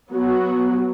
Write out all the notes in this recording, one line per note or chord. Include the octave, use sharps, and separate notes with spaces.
F#3 B3 F#4